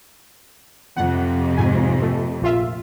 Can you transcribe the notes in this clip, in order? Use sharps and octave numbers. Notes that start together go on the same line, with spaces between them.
F2 C3 F#5
G#2 G#5
A3
A#1 F4 E5